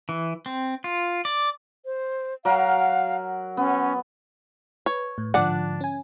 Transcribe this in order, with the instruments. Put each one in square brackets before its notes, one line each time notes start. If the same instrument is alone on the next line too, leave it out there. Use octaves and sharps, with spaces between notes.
[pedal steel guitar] E3
C4
F4
D5
[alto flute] C5
[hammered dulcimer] F#3 A#4 F#5 [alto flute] F5
[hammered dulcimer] B3 [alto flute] C#4
[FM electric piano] B4 [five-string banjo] C#5
[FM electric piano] A2
[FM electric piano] G#2 D3 F3 [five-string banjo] D4 D5 F#5
[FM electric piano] C#4 G#5